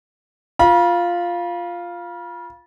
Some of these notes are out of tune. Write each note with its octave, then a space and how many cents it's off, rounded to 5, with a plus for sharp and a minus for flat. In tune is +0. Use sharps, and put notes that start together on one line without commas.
F4 +0 B5 -40